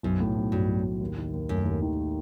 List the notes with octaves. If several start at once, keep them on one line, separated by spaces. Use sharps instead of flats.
B1 F#2
A2
B1
G2 F#3
B1
A2
D#2
D#3
D#2
F#2 A3
D#2
D#3